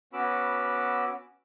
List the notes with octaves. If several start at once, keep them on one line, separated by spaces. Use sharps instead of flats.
B3 C#4 F#4 B5 D6 E6